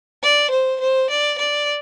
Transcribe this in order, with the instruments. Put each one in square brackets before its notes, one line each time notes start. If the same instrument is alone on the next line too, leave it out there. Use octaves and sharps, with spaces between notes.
[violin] D5
C5
C5
D5
D5